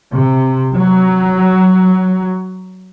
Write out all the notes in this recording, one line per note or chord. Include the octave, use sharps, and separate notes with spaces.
C3
F#3